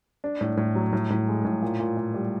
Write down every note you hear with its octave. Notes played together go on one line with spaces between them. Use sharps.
D4
A2
A2
F#3
A2
A2
G#3
A2
A#2
A#2
A#2
G3